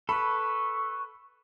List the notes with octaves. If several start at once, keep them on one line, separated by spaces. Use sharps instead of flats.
A4 B4 B5 C#6